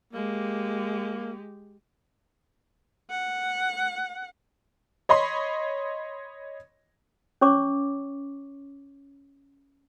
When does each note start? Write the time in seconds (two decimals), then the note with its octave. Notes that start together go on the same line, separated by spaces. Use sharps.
0.13 G#3 A#3 G4
3.10 F#5
5.09 C#5 D#5 B5 C6
7.41 C#4 C#5 C#6 D6